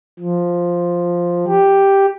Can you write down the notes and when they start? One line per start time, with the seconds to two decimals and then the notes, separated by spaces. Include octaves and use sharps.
0.19 F3
1.47 G4